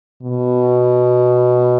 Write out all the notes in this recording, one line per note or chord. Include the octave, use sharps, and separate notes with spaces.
B2